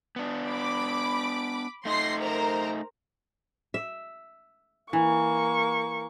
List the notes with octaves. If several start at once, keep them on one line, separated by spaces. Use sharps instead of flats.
B3 D4
B5 D6
A3 D#4 C6 A#6 C7
A#4 C5 A#5
E5
E3 A#3 C#6